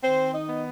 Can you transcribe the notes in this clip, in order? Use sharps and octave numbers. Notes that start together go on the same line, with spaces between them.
D#3 C4 C5
D#4 D#5
B3